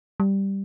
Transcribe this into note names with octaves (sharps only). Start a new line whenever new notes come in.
G3